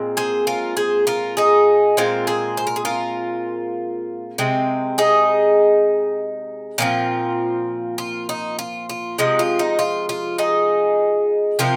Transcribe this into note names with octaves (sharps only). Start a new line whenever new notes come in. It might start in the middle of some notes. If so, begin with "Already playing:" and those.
Already playing: A#2 G#3 C4
G#4 C5
F4 A#4
G#4 C5
F4 A#4
D#4 G#4
A#2 G#3 C4 F4 A#4
G#4 C5
C5
A#4
G#4
F4 A#4
C3 G#3 C4
D#4 G#4
A#2 F3 C4 F4
F4
D#4
F4
F4
C3 F3 G#3 D#4
F4
D#4
F4
F4
D#4 G#4
C3 F3 C4 F4 A#4